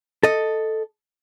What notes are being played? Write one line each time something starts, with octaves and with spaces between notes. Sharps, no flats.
A4 D#5